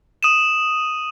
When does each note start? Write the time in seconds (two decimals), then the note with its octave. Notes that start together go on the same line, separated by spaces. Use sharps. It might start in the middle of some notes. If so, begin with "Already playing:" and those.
0.23 D#6 D#7 E7